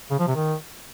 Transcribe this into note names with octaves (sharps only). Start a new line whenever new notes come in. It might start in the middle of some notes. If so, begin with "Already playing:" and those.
C#3
F3
C3
D#3